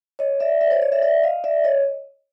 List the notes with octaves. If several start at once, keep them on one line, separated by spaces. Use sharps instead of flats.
C#5 D#5
D5 E5
D5 E5
C#5
C5 D5
C#5 D#5
D5 E5
D5 E5
D#5 F5
D5 E5
C#5 D#5